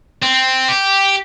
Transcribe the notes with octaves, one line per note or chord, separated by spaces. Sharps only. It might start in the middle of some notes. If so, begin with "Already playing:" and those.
C4
G4